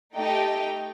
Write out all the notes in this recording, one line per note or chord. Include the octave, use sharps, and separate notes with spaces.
A3 D#4 G4 G5